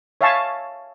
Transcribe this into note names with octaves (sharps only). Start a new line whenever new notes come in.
C#5 E5 F5 G#5 A5 C#6